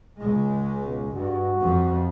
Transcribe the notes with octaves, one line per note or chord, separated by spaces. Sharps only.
C#2 G#3
B2
G2 F#4
F2 F3